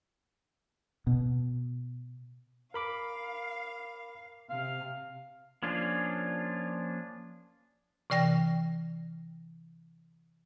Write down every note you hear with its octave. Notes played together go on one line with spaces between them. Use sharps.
B2
A#4 F5 B5 D6
C3 F5
F3 A#3 C#4 D4 F4
C3 E3 D5 G5 A#6